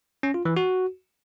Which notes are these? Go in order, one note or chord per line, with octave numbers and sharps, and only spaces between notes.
C#4
F4
E3
F#4